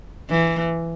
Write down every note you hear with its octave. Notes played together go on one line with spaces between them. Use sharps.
E3